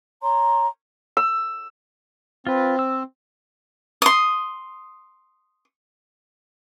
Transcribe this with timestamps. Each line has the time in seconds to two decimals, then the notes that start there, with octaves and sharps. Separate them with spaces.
0.22 C#5 A#5 C6
1.17 E6
2.47 C4 F4 B4
2.79 E6
4.02 C6 D#6